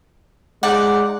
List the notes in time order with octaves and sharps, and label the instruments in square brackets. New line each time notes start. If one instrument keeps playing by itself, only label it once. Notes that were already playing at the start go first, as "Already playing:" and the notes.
[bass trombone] G#3 [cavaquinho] D#4 D5 F#5